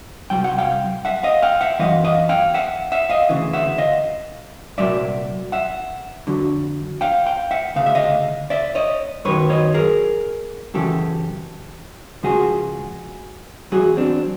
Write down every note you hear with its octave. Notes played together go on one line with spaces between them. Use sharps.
C2 B2 F#3 G5
F#5
F5 G5
E5 F#5
D#5 F5
F5 G5
E5 F#5
F#2 C#3 E3 D#5 F5
D#5 F5
F5 G5
E5 F#5
E5 F#5
D#5 F5
D2 C#3 E3
E5 F#5
D#5 F5
C2 A#2 F#3 D5 E5
E5 F#5
F2 D3 F#3
F5 G5
F5 G5
E5 F#5
D2 C#3 F5
E5
D#5 F5
D5 E5
C#5 D#5
F#2 D#3 F#3 B4 C#5
C#5 D#5
G#4 A#4
F#2 C#3 E3 G4 A4
C#2 C#3 F3 F#4 G#4
E2 B2 F#3 F#4 G#4
C4 D4